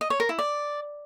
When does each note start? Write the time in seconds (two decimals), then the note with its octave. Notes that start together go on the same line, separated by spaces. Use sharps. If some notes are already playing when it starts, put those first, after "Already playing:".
0.01 D#5
0.10 C#5
0.20 A#4
0.29 E4
0.39 D5